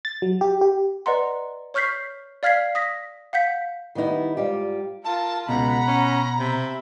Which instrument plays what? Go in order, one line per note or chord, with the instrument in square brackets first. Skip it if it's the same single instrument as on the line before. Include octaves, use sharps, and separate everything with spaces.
[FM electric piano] A6
F#3
G4
G4
[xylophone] B4 D5 D#5 F#5 A#5 C6
C#5 C#6 F6 G6 B6 C7
D5 F5 F6 G#6 B6 C7
D#6 A#6 B6
F5 F#5 G6 B6
[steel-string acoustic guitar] D#3 G3 B3 D#4 E4
G#2 G3 F4 G4
[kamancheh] F4 A#4 [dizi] A5
[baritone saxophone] C#2 [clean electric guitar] B2 [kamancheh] F#5 B5 [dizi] A#5
[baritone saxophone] C#4
[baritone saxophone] C3 [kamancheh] E5 B5